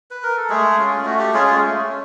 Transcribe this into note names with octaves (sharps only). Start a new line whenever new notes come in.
B4
A#4
A4
G#3 A3 G#4
C#4 F4
A3 F#4
G4
G#3 C#4 F4 G#4
G#3 G#4
A3
C#4